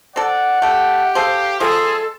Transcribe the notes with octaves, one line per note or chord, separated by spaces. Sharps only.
C4 A4 D5 F#5
A3 G4 A4
G#4 A4 C5 F5
F3 G#3 G#4 A4 C6